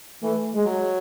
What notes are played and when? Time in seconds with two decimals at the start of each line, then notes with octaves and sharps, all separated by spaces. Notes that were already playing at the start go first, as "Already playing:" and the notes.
0.22 E3 A3
0.54 G#3
0.65 F#3